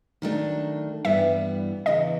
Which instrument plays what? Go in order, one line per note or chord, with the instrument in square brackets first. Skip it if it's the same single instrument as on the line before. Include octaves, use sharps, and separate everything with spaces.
[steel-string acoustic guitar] D#3 F#3 A3 D4
[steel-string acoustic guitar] G2 E3 G3 B3 E4 [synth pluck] E5
[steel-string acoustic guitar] E2 C#3 E3 [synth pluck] D#5